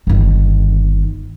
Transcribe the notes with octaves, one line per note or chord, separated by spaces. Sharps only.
G1 D#3